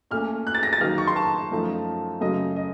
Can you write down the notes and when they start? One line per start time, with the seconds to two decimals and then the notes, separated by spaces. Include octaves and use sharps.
0.11 A#2 A3 C#4 F6
0.47 F#6
0.55 A6
0.63 A#6
0.73 A6
0.81 D#3 F#3 A#3 D#4 F6
0.98 C#6
1.07 C6
1.16 A5
1.51 F#2 F3 A3 D#4
2.21 F#2 C#3 F#3 A3 D#5
2.56 D#5